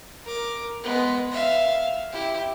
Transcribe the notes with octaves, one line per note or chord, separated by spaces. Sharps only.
A#4 D6
G#3 B3
E5 F5
E4 G4